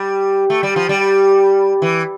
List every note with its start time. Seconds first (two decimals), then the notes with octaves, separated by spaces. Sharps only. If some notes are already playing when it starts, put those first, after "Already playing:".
Already playing: G3
0.50 A3
0.63 G3
0.76 F3
0.89 G3
1.82 E3